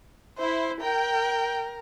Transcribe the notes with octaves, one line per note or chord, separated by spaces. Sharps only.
E4 C5
A#4 G5